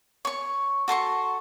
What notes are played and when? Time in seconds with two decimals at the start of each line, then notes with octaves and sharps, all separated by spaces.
0.25 C#5 C#6
0.88 F#4 A4 C6 C#6